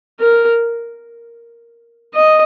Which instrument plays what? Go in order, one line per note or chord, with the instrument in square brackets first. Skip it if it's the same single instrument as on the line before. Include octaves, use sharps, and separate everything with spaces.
[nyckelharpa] A#4
D#5